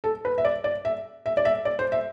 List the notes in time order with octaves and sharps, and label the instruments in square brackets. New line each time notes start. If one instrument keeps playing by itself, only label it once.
[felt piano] A4
B4
E5
D5
D5
E5
E5
D5
E5
D5
C5
E5